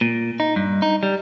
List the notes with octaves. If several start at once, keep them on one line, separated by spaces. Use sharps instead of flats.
A#2
D#4
G2
D#4
G3